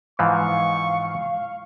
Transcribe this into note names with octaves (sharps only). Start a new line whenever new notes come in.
G#2 E3 F3 F5 C#6